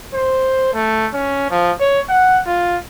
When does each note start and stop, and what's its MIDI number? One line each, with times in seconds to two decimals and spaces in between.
0.14 0.72 72
0.74 1.08 57
1.13 1.48 61
1.50 1.72 53
1.80 2.00 73
2.09 2.40 78
2.46 2.78 65